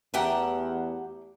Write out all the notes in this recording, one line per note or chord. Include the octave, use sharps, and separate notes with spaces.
E2 A3 G4 F#5 G5 A5 A#5